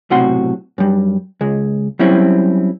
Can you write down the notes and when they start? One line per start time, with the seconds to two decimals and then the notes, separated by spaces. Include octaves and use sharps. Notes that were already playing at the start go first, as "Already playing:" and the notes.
0.10 B1 A2 C3 F#4 F#5 C6
0.78 F#2 G3
1.41 C#2 G#3
1.99 F#3 G3 C4 C#4 E4